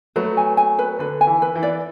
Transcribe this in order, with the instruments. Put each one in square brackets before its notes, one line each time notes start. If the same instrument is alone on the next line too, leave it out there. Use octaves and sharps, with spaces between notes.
[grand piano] F#3 A3 [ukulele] B4
[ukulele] G#5
G#5
B4
[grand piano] D3 [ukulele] B4
[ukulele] G#5
[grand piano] E3
[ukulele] B4
[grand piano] E3
[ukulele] D5